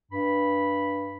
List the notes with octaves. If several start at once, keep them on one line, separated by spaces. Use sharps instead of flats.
G2 B5